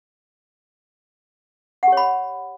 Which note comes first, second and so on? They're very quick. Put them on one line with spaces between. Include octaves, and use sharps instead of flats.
F#5 G4 C#5 B5